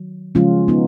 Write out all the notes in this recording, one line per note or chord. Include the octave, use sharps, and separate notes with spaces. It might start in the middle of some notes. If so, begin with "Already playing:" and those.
Already playing: D#3 F#3
C#3 F3 G#3 C#4 F4
B3 D#4